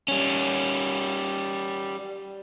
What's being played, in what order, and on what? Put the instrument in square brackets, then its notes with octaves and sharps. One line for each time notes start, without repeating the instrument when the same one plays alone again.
[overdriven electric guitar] G3 C#4